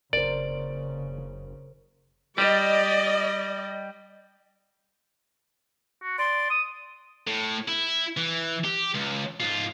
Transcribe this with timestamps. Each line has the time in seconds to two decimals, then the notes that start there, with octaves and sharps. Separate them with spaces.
0.13 F#1 C#3 A#4 C5 D5
2.38 G3 D5 D#5
6.02 F#4
6.18 D5 C6
6.50 D#6
7.27 A2
7.68 E4
8.17 E3
8.64 G4
8.94 C#2
9.40 G#2 F4